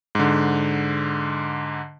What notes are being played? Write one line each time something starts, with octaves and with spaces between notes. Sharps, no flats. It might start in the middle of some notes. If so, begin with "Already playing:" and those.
G#2 D3